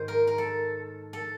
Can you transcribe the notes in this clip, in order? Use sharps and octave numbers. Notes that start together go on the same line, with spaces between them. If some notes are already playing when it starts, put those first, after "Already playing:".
Already playing: G#2 D#3 C5
A#4
A#4
A4
A4